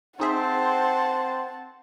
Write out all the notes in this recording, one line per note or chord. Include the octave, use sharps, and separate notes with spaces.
C4 D#4 G#4 C5 E5 F#5 A5